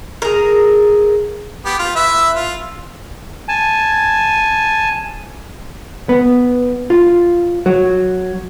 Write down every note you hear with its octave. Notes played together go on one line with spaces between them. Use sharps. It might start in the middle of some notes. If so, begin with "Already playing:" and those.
G#4 A#4
B3 G4
F4
E4 B4 E5
F4
G#5 A5
B3
F4
F#3